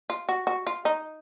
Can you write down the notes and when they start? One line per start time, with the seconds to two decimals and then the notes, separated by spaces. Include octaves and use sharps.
0.10 F4
0.29 F#4
0.47 F#4
0.67 F4
0.85 D#4